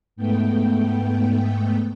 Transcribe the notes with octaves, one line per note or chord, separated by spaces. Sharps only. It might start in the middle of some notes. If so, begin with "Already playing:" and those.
G#2 A3 B3 G5